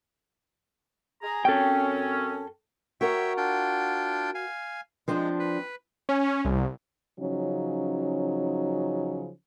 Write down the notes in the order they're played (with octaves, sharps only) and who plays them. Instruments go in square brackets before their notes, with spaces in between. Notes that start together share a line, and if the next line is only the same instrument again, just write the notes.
[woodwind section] G#4 A#5
[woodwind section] F#2 C4 C#4 [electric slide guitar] A4 G5
[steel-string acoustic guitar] F#4 A#4 [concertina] C#5 E5 G5
[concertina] D4 F4 G5
F5 G#5
[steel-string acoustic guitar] F3 C4 D4 [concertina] G#3
[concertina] B4
[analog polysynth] C#4
C2
[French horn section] C#3 F3 F#3 C#4 D#4